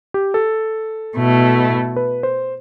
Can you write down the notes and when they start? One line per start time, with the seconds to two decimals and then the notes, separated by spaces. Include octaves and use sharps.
0.14 G4
0.34 A4
1.16 B2 A3 E4
1.96 B4
2.23 C5